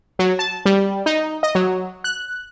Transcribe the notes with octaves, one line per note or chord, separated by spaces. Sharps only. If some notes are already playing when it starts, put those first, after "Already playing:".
F#3
A5
G3
D#4
D#5
F#3
F#6